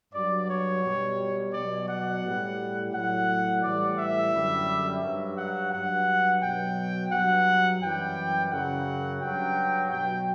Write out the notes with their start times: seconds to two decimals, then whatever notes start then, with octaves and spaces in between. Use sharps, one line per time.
0.13 G2 F#3 D5
0.49 C#5
0.83 B2 G3
1.53 B2 F#3 D5
1.88 F#5
2.23 A2 G3
2.93 A2 F#3 F#5
3.62 A2 E3 G3 D5
3.97 E5
4.32 F#2 D3 G3
5.02 G2 F#3
5.37 F#5
5.72 G2 F#3 F#5
6.42 B2 F#3 G5
7.12 G2 F#3 F#5
7.82 F#2 E3 G3 G5
8.51 F#2 C#3 F#3 F#5
9.21 G2 F#3 G5
9.91 B2 F#3 G5